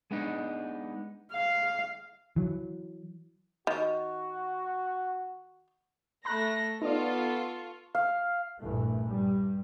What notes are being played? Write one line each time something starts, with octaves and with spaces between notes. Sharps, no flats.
G#3 B3 D4 D#4
F5
E3 F#3
D#3 F#4
A3 A#5 B5 F#6 A#6
B3 D#4 F4 A4 D5 C#6
F5
A#1 G2 E3 A3
G2 G3